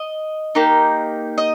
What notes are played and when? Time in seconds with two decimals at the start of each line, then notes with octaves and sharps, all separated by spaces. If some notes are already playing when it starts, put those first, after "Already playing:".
Already playing: D#5
0.55 A#3 D#4 G4
1.38 D#5